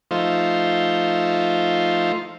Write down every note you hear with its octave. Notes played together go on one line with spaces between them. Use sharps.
F3 A3 D#4 F4 C5